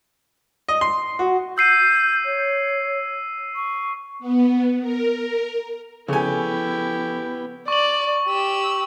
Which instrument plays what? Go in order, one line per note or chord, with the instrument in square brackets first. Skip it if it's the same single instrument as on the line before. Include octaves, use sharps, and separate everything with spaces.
[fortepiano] D#5
C6
F#4
[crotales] E6 C7 D#7 [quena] G6
[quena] C#5
C#6
[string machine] B3
A#4
[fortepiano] C#3 G#5 [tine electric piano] F3 A4 C#6 [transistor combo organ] B3 [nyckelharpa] E4 G4
[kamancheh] D5 [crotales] C#6 F#7
[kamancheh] G4 E6